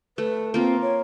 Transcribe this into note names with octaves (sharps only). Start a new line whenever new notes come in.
A3 B4
A#3 C4 F4
C#5